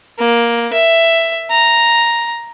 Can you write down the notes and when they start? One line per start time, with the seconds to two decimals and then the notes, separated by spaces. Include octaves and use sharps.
0.19 A#3
0.73 E5
1.51 A#5